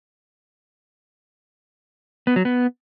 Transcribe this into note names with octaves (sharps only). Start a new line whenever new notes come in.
B3
F#3
B3